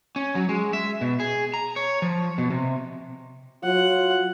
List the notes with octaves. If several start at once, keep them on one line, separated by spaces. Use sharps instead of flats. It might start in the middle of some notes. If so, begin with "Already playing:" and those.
C#4
F#3
G#3
E5
B2
G#4
A#5
C#5
F3
B2
C3
F#3 F4 F#5